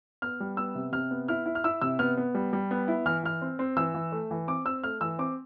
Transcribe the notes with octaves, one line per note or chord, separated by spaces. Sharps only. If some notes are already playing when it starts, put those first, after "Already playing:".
B3 F6
G3
B3 E6
C3
C3 F6
B3
E4 F6
E4
F6
E4 E6
C3 E6
B3 F6
B3
G3
G3
B3
E4
E3 F6
E3 F6
C4
C4
E3 E6
E3
A3
E3
C4 D6
C4 E6
A3 F6
E3 E6
C4 D6